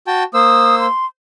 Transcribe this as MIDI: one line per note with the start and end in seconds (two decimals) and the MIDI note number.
0.07 0.23 66
0.07 0.23 79
0.07 0.23 81
0.34 0.87 58
0.34 0.87 72
0.34 0.76 87
0.34 0.87 88
0.80 1.06 84